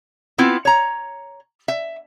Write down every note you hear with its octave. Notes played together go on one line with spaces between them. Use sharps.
B3 C4 E4 F4
C#5 A#5
E5